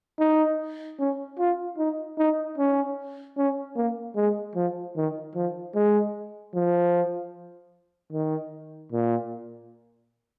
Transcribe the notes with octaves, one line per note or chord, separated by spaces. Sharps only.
D#4
C#4
F4
D#4
D#4
C#4
C#4
A#3
G#3
F3
D#3
F3
G#3
F3
D#3
A#2